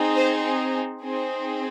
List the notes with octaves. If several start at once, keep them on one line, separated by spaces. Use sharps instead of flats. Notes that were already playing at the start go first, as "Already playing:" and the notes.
Already playing: C4 D#4 G#4
C5
C4 D#4 G#4